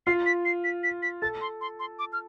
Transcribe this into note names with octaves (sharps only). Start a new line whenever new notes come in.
F4 C7
B6
C7
B6
B6
B6
A4 A6
C6
C6
C6
D6
F6